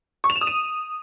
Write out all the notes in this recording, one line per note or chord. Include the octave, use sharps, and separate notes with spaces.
C#6
F7
E7
D#6
D#7